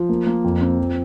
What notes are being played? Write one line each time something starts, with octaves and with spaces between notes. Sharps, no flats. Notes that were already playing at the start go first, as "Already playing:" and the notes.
Already playing: F3
A#3
A#3
F2
C4
F3